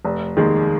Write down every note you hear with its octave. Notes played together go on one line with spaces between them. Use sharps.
F1
D#2 D#3 G#3